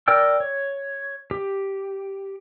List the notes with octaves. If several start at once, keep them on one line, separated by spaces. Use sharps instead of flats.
A#4 D5 G5 E6
C#5
G4